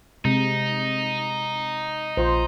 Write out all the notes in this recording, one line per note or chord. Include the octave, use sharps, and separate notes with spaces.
C3 G#3 D#4
A#1 F4 C5 C6